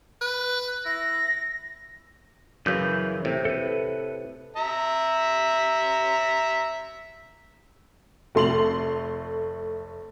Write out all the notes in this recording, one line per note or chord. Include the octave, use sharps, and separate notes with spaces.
B4
E4 A#6
F#2 C#3 E3 B4 G6
A2 C3
A4 B4
E5 A#5
F1 A3 C6 F7 F#7